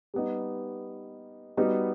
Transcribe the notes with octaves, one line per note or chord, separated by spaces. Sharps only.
G3 B3 D#4
G3 B3 D#4 F#4